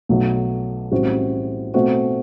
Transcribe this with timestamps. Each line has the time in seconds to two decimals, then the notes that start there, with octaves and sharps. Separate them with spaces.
0.09 B1 B2 F#3 A3
0.91 A1 A2 G3 C4 F#4
1.74 B2 A3 C4 F#4